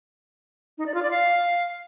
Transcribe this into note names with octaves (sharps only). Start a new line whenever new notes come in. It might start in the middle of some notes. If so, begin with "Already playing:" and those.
D#4
D5
F4
D5
F5